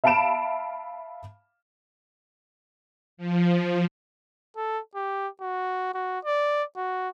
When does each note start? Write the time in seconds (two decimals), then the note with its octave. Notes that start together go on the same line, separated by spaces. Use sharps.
0.04 E5 F5 A5 B5 D7 E7
3.17 F3
4.56 A4
4.95 G4
5.41 F#4
5.94 F#4
6.25 D5
6.76 F#4